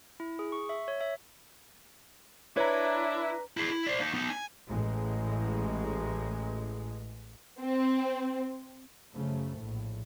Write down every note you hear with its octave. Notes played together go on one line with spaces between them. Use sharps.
E4
G#4
C#6
E5
C#5
E5
D4 E4 B4 C#5 A#5
E4 G#4
E4
C5 D5
A#3 D#4
B3 D#4
G#5
A1 A2 G#3
C4
F#2 C#3 F3 A3
A#1 A2